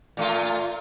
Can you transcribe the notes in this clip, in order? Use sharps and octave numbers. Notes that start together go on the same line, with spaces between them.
A#2 A3 F4